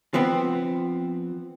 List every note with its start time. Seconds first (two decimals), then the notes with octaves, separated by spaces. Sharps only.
0.14 F3 B3 C4